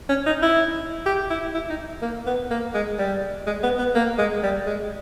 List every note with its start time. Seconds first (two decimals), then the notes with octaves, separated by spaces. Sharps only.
0.09 C#4
0.26 D#4
0.42 E4
1.06 G4
1.30 E4
1.54 E4
1.69 D#4
2.02 A#3
2.26 B3
2.50 A#3
2.74 G#3
2.98 G3
3.46 G#3
3.63 B3
3.78 B3
3.95 A#3
4.18 G#3
4.43 G3
4.67 G#3